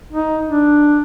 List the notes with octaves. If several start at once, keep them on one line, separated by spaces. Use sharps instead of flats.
D#4
D4